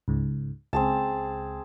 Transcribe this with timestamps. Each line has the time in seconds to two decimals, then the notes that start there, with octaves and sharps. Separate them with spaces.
0.08 C#2 G#2
0.73 C#2 C4 G#4 A5